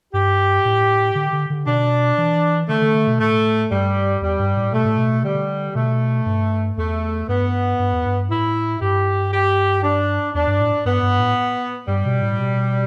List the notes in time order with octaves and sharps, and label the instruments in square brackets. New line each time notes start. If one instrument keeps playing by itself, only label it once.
[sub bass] G2 [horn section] G4
[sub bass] A2
D3
D3
D3
[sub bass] B2 [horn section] D4
[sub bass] E3
[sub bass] D3 [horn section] A3
[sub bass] D3
D3
B2
[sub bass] A2 [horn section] A3
[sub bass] G2 [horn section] G3
[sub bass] E2 [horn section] G3
[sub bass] G2
A2
[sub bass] B2 [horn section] A3
[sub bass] A2
B2
[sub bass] D3 [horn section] G3
[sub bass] B2 [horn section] A3
[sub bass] G2
[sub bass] E2 [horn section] A3
[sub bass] G2 [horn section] B3
[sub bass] G2
E2
G2
[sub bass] A2 [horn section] E4
[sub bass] G2 [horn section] G4
[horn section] G4
D4
[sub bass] E2 [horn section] D4
[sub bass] G2
A2
[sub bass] G2 [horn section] B3
[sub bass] G2
A2
[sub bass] G2 [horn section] G3
[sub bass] B2
A2
B2